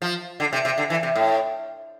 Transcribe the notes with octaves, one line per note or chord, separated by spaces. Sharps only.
F3
D3
C3
C3
D3
E3
C3
A2